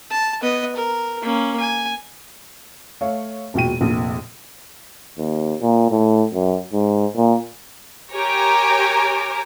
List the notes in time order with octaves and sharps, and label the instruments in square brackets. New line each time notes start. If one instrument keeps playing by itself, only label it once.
[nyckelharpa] A5
B3 D#5
A#4
A#3 C#4
G#5
[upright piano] A3 C#5 F5
E1 A#2 F#4 G5 D#7
F1 A#1 A#2
[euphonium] D#2
A#2
A2
F#2
G#2
A#2
[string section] G4 A#4 C#5 G#5 A#5 D6